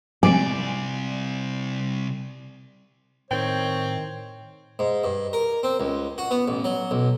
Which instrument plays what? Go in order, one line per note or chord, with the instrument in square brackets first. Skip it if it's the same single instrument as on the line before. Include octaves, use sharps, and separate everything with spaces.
[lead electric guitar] C3 G3 [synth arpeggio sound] F3 G#3 C4 [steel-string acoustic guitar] D5 [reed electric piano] G#5
[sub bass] A2 [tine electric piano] D#3 G5 [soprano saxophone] C4 [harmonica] C#5
[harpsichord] G#2
G2
A#4
C4
C#2
F#4
B3
A1
F#3
B1